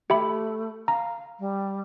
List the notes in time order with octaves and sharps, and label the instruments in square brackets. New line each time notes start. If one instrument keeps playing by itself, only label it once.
[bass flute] A3 [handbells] G4 E5 B5
[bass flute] F5 [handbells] A#5
[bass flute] G3